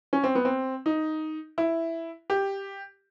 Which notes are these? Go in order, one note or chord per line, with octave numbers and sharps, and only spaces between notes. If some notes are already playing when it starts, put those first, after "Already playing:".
C#4
C4
B3
C4
D#4
E4
G4